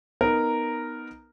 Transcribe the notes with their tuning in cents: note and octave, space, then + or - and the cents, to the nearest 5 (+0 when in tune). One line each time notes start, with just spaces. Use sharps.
B3 +0 D#4 +0 A#4 -5